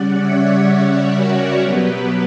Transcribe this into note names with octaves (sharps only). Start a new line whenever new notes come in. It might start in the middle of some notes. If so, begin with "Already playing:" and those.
Already playing: C#3 G3 C#4 D5 F#5
C#5 E5
C#5 E5
F#4 A#4
B2 F#3 B3 G4 B4